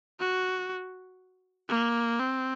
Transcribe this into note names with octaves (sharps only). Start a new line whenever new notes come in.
F#4
A#3
C4